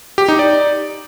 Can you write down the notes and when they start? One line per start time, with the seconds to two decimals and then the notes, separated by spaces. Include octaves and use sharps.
0.18 G4
0.28 D#4
0.39 D5